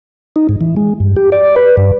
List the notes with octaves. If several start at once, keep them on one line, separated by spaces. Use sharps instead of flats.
D#4
G#2
E3
G#3
G2
G4
D5
B4
G2